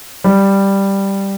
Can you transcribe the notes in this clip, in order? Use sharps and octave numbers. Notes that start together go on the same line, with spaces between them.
G3